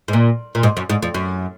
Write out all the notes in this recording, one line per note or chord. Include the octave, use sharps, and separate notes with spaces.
G#2
A#2
A#2
G#2
F#2
G#2
F2
F#2